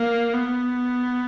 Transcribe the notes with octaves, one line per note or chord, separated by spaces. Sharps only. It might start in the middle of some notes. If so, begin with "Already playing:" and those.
Already playing: A#3
B3